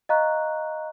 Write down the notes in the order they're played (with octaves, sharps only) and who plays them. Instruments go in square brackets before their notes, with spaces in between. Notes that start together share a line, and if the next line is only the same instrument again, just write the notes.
[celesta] D#5 F5 A#5 C#6 F#6